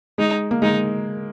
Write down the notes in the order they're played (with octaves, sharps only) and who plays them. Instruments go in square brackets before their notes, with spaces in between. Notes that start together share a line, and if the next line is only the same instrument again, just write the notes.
[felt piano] G#3 [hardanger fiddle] D#4
[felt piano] A#3
[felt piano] G#3 [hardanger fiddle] D#4